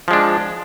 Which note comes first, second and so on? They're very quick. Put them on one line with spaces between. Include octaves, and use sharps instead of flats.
F3 G#3 D4